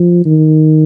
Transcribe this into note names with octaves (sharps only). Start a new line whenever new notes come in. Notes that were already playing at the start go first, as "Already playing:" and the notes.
Already playing: F3
D#3